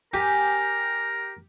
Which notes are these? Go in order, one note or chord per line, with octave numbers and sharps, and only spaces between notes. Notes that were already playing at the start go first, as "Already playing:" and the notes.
G4 A#4 G#5